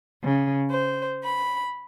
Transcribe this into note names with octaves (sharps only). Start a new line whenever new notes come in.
C#3
C5
B5